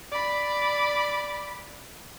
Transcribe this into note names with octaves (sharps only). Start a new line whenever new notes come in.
D5 B5